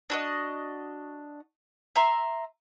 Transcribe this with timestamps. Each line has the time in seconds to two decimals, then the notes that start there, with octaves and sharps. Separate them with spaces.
0.10 D4 F#4 D#5
1.96 E5 A#5 C6